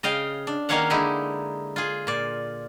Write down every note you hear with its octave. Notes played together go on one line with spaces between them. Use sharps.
C#3 D#5 F5 G5
D4
D#3 A#3 C#4 C#5 F5 F#5
D3 G#3 D#4 E4 G4
F4 G#4
A#2 D5